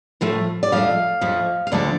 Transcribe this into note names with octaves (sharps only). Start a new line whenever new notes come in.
A2 F3 A3
D5
F2 F3 A3 F5
F2 F3 A3
F5
D2 D3 F3 A3 D5